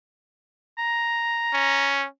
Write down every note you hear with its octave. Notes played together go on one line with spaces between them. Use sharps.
A#5
C#4